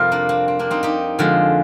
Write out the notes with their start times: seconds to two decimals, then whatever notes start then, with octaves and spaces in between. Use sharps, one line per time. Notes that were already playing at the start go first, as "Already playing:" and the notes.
Already playing: F2 C3 G3 F4 G4 A#4
0.12 A#3 D4
0.29 C4
0.48 C4
0.59 A#3 D4
0.71 C4 D#4
0.83 D#4 G4
1.19 F2 D3 F3 G#3